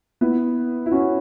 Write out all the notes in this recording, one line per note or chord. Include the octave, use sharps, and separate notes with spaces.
B3 E4
E4
C#4 F#4